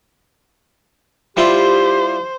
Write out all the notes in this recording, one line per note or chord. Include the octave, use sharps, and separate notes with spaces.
G3 E4 F4 G4 C5